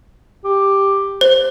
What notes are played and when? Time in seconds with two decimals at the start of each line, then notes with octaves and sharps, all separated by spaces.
0.45 G4
1.21 C5